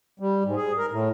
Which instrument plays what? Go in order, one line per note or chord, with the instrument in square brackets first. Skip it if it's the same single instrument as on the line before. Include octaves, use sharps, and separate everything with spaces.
[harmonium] G3
G#2
G#4
A#4
A2